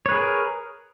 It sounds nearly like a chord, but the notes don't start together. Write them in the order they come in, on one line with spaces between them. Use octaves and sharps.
C#5 B4 G#4 A#4